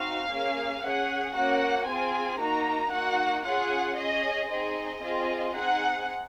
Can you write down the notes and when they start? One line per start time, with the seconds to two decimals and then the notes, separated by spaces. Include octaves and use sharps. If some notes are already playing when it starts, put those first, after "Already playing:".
Already playing: C4 D#4 F#4 F5
0.30 A#3 C#4 G#4
0.82 C#4 G#4 F#5
1.34 A#3 C#4 F#4 F#5
1.87 C4 F4 G#4 G#5
2.40 A#3 D#4 F#4 A#5
2.92 A#3 D#4 F#4 F#5
3.44 C#4 F4 G#4 F#5
3.97 C#4 G#4 D#5
4.49 C4 D#4 G#4 D#5
5.02 C4 F4 G#4
5.54 C4 D#4 G#4 F#5